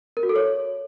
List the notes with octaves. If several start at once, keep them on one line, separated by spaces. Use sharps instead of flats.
A#4
F#4
A4
C#5